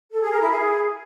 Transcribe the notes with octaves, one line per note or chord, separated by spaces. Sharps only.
A4
G#4
A#4
E4
G#4